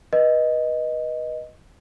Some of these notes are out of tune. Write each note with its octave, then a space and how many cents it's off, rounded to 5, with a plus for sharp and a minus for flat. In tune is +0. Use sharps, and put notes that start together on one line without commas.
B4 -20 D#5 +0